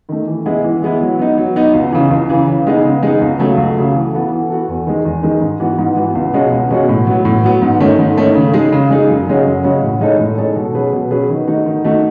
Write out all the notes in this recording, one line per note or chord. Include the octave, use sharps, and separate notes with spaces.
D#3 A3
E3
G#3 B3 E4
E3
G#3 B3 E4
F#3
B3 D#4
F#3
B3 D#4
C#2
C#3 E3
C#2
C#3 E3
C#3
G#3 B3 D#4
C#3
G#3 B3 D#4
C#2
C#3 F#3 A3
C#2
C#3 F#3 A3
E3
B3 F#4 A4
E3
B3 F#4 A4
E2
D#3 G#3
E2
D#3 G#3
G#2
E3 B3 F#4
G#2
E3 B3 F#4
C#2
B2 G#3 C#4 F#4
C#2
B2 G#3 C#4 F#4
A2
F#3 B3
A2
F#3 B3
G#2
D#3 A3 C#4
G#2
D#3 A3 C#4
C#3
G#3 D#4 G#4
C#3
G#3 D#4 G#4
F#2
C#3 G#3 C#4 F#4
F#2
C#3 G#3 C#4 F#4
A2
G#3 D#4 A4 C#5
A2
G#3 D#4 A4 C#5
B2
F#3 C#4 G#4 B4
B2
F#3 C#4 G#4 B4
D#3
A3 D#4 F#4
D#3
A3 D#4 F#4